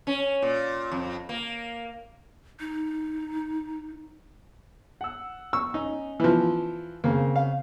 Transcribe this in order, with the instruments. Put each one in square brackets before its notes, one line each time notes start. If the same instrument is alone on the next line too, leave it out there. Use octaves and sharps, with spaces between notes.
[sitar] C#4
A#2
F2
A#3
[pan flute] D#4
[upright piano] F#5 E6
[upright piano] C#6 [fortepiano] E6
[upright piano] C#4 [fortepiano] D#4
[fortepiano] E3 F3
[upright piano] C#3 C4 [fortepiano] A#3
[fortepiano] F5